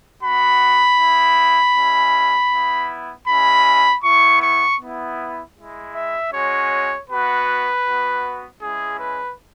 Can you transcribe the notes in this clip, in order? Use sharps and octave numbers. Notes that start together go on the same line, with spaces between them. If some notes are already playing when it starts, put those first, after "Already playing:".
B3 F#4 B5
B3 E4
G#3 C#4 E4
B3 E4
G#3 C#4 E4 B5
B3 E4 C#6
C#6
B3 E4
G#3 E4
E5
G#3 C#4 F#4 C#5
B3 F#4 B4
B3 F#4
G#3 C#4 E4 G#4
B4